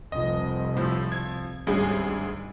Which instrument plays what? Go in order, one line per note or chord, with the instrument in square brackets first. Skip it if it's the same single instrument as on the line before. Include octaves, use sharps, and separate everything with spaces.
[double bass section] F1 C2 F2 [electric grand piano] D#5
[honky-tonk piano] A2 E6 [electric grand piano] F3
[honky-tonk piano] G#6
[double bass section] G#1 D#3 [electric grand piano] D2 G3 [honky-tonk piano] G#3 C#4 G#4